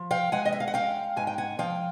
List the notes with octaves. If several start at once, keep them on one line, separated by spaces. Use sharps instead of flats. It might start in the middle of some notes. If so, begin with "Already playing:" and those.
Already playing: F3
F5 G5
G#3 F#5 G#5
D#5
E5
F5
F#5
C#4 F5 G5
G#2 G#5
G5
F#5 G#5
F3 F5 G5